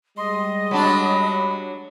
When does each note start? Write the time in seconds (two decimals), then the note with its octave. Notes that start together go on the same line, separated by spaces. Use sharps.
0.17 G3 G#3 D#5 C6
0.71 F#3 D4 B5